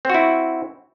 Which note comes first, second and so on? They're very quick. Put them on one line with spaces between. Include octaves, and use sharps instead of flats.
C4 F#4 E4